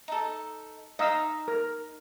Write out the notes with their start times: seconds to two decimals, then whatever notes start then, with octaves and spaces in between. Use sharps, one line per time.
0.08 D#4 A4
0.99 D#4 D#5 F5 E6
1.48 A#4